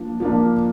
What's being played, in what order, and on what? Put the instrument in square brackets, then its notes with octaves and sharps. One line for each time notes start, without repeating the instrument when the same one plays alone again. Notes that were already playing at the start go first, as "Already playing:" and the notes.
Already playing: [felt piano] F3 A#3 D4
F3 A#3 D4